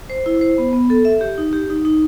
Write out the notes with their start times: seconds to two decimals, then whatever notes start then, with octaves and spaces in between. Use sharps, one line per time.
0.10 C5
0.26 E4
0.41 C5
0.58 B3
0.73 B3
0.90 A4
1.05 E5
1.21 G4
1.38 D#4
1.53 G4
1.70 D#4
1.85 D#4